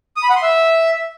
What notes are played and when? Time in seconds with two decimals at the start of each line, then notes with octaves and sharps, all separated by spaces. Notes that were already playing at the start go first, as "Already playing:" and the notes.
0.17 D#6
0.23 B5
0.30 F#5
0.36 C6
0.43 E5